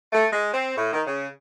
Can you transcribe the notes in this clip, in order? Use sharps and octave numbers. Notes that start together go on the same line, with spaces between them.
A3
G#3
C4
A2
D#3
C#3